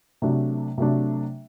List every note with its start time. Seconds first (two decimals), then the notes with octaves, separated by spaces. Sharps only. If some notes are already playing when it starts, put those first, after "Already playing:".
0.22 C3 F#3 A3 D4
0.78 C3 F#3 A3 D4